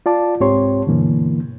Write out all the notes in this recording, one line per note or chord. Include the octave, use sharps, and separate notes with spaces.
F4 D5 A5 D6
C2 G#2 C4 G4 C#5 C6
G2 B2 D3 E3 A#3